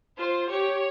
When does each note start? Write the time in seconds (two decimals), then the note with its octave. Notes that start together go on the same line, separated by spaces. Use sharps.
0.18 F4 C5
0.50 G4 C#5